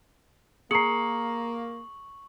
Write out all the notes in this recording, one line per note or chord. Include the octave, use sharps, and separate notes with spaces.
A#3 G#4 A#5 C#6 C7 C#7 F#7